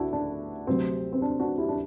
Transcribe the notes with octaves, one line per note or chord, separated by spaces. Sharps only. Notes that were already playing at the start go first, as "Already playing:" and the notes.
Already playing: D2 D3 D4 E4 F#4
D4
D2 C3 F#3 C4
C4
D4
D4 F#4
E4 G4
D4